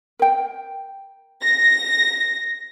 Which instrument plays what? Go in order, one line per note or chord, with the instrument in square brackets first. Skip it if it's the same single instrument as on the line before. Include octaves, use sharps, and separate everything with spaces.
[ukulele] A#4 G5
[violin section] A#6